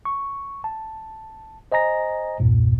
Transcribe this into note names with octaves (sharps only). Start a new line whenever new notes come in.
C#6
A5
C5 D#5 G#5 A#5 A#6
B1 E2 G2 A#2